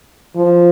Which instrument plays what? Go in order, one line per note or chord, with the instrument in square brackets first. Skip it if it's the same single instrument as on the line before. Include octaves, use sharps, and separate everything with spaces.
[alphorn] F3